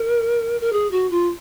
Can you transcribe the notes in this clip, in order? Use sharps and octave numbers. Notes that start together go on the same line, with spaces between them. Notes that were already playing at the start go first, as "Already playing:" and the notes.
Already playing: A#4
A#4
G#4
F#4
F4